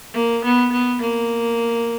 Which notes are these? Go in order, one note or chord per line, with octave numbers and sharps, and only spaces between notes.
A#3
B3
B3
A#3